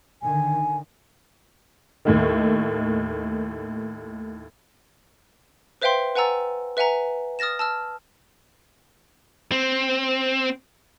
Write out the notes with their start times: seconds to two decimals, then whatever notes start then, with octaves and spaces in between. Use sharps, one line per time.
0.22 D3 D#3 G#5
2.05 D#2 A2 D#3
5.82 B4 C5 E5 F5 G5 C6
6.16 B4 F#5 G#5 A#5 E6 A6
6.77 B4 E5 F#5 G#5 A#5
7.39 D#6 F6 A6 A#6 E7
7.59 A5 E6 F6
9.52 C4